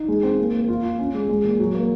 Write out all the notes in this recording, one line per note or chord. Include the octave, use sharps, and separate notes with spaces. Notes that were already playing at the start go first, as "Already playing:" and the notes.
Already playing: D#4
G#3
C4
A#3
A#3
F4
F4
C#4
G#3
G#3
A#2
F#3
A#3